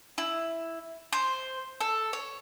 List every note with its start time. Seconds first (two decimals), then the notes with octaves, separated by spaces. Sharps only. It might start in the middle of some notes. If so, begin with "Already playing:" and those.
0.18 E4
1.13 C5
1.81 A4
2.13 C#5